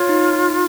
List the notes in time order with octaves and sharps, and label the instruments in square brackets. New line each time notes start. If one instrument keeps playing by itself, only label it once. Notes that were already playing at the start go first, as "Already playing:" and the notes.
Already playing: [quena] F4 [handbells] C#5
[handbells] D#4
D#4